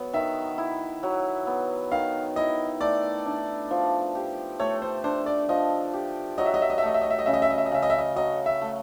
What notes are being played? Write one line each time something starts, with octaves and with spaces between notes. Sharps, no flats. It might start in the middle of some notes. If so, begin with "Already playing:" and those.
Already playing: F#3 B3
D#3 E5
E4
F#3
B3
D#3 F5
E4 D#5
A3 D5
D4
F3
G4
A3 C#5
C5
D4 C5
D5
F3 D#5
G4
F#3 D#5
E5
D#5
E5
D#5
E5
A3 D#5
E5
D#5
E5
D#5
C#3 E5
D#5
E5
D#5
E5
D#5
C#3 E5
D#5
E5
D#5
F#3 D#5
E5
A3